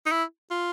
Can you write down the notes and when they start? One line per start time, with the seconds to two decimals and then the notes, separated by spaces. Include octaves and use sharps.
0.06 D#4
0.12 E4
0.50 F4